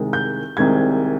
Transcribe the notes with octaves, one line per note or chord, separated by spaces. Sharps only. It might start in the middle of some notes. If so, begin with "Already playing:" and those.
Already playing: C2 C3 D#3 G#3
G6
C2 C3 D#3 G#3 G#6